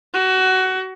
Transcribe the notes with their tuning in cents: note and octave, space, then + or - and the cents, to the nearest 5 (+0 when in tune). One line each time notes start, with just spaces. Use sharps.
F#4 +20